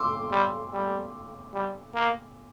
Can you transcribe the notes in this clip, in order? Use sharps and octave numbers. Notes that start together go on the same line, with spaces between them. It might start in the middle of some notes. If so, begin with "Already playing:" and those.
Already playing: C6 D6 E6
G3
G3
G3
A#3